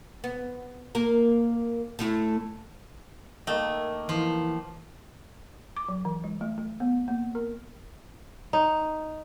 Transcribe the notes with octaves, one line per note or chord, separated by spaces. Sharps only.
B3
A#3 A#4
A2 A3 E4
D#3 A3 A#3 D#5
E3 F3
D6
F#3
E3
G#3
A3
A3
B3
A#3
A#4
D#4